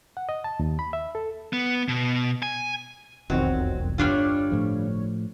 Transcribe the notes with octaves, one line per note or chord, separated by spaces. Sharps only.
F#5
D#5
A5
D#2
B5
E5
A4
B3
B2
G#5
E1 B1 F2 D#3 F#3 C4
G1 G3 D4 F4 C#5
A2 F3